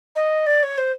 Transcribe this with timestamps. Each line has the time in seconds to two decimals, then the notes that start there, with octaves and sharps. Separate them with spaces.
0.15 D#5
0.46 D5
0.63 C#5
0.77 C5